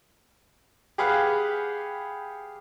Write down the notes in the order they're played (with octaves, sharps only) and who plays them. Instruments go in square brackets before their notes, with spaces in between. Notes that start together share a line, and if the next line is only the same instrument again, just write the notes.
[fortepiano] G4 G#4 B4 F5 F#5